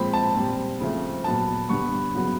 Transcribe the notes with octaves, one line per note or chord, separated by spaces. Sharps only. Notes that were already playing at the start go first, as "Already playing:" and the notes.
Already playing: A#2 F3 G#3 C4 B5
A5
A#2 G3 C4
C#3 F3 A3 C4
A#2 F#3 B3 A5
G2 D3 G3 B3 C#6
C#3 F#3 B3